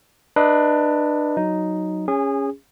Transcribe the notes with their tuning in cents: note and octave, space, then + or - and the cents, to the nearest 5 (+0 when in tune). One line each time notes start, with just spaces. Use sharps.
D4 +25 B4 -15 D#5 +35
F#3 +0 D#4 +0
C#4 +0 G#4 -25